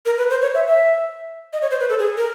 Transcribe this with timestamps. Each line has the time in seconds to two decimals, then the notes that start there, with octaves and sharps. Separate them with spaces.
0.06 A#4
0.18 B4
0.30 C5
0.42 C#5
0.55 E5
0.67 E5
1.53 D#5
1.62 C#5
1.71 C5
1.80 B4
1.89 A4
1.99 G#4
2.17 A#4